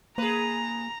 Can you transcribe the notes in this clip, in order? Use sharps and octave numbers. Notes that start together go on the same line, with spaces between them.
A#3 G#4 B4 A#5